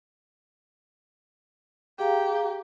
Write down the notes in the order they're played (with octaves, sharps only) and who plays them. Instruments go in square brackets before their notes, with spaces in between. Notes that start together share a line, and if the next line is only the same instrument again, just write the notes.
[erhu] G4 [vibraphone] G#4 F5 A#5